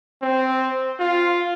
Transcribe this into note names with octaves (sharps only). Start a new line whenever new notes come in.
C4
F4